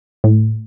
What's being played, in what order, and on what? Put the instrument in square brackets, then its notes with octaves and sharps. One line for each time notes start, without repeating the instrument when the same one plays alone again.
[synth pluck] A2